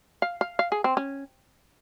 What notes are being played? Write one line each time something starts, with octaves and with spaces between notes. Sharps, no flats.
F5
F5
F5
G#4
C4
C#4